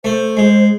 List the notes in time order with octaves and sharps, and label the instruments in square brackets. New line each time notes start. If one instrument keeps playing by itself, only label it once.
[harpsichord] A3 [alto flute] C5
[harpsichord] G#3